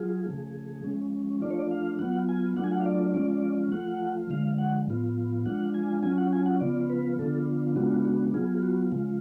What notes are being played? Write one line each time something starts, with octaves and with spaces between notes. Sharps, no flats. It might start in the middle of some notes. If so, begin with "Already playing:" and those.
Already playing: F#3 F4 G#4
C#3 F3 A3
F3 G#3 C#4
F3 A3 D4 F4 D5
C#5
D5
F5
F#3 B3 F4 F#5
G#5
F#3 A3 D4 F4 F#5
G#5
F#5
F5
D5
F3 G#3 C#4 F4 D5
F3 A3 F4 F#5
D3 F3 G#3 F5
F#5
A2 F3 B3 F4
F3 G#3 D4 F4 F#5
G#5
F#3 C#4 F4 G#5
F#5
G#5
F#5
C#3 F3 B3 F4 D5
B4
D3 F3 B3 D4 F4 A4
C#3 G#3 B3 D4 F4 F#4
F4
F#4
F#3 B3 F4 G#4
F#4
C#3 F3 G#3 F4